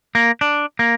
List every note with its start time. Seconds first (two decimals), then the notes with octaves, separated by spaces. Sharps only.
0.15 A#3
0.41 D4
0.79 A#3